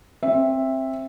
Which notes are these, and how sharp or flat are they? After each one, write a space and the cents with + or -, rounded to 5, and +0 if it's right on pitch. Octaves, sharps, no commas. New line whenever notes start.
C4 +20 E5 +0